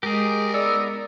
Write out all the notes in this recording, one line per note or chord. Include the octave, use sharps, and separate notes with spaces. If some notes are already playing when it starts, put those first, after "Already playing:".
G#3 G4 G#4 A#4
B3 D#4 D5 E6